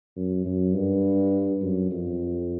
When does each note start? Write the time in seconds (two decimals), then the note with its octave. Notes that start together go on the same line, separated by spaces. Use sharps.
0.16 F#2
0.45 F#2
0.73 G2
1.61 F#2
1.91 F2